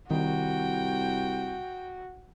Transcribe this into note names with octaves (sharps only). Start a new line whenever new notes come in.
C2 D#3 F#4 G5